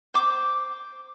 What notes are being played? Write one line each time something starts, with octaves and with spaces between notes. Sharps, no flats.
C5 D6